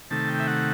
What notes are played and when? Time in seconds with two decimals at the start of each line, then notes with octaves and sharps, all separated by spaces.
0.11 C3 D#3 A3 A5
0.28 G5
0.40 E5
0.47 F#5